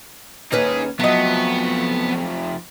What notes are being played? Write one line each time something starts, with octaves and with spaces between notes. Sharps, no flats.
D#2 C#4 D#4 G#4 B4
F2 F#3 A3 B3 D#5